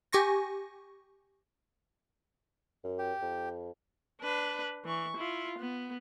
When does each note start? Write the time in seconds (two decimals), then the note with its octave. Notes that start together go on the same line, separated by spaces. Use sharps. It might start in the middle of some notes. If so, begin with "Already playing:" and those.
0.13 G4 G#5 C#6 A#6
2.84 F#2
2.99 G4
3.22 F2
4.21 D4 B4
4.85 E3 C#6
5.17 E4 F4
5.58 B3